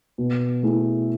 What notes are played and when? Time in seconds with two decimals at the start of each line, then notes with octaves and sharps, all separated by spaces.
0.18 B2
0.63 A3 E4 G#4